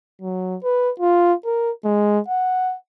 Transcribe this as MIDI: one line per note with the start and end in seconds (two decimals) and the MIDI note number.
0.22 0.57 54
0.64 0.91 71
1.00 1.34 65
1.45 1.71 70
1.85 2.19 56
2.29 2.75 78